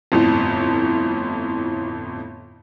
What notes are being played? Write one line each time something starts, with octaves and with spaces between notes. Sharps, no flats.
G1 F2 A2